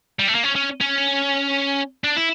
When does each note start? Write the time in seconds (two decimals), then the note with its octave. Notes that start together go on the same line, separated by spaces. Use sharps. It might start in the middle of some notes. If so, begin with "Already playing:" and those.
0.19 G3
0.28 A3
0.35 A#3
0.44 C#4
0.56 C#4
0.81 C#4
2.04 D4
2.17 E4